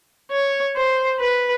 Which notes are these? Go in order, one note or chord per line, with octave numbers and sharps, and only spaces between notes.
C#5
C5
B4